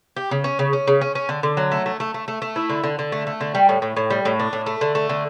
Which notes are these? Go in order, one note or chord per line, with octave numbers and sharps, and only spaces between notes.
G4
C#3
C#4
C#3
C#4
C#3
C#4
C#4
D3
D3
F#3
A3
A3
A3
A3
A3
A3
E4
D3
D3
D3
A3
A3
D3
G3
A2
A2
A2
G3
A2
D4
A2
A3
D3
A3
D3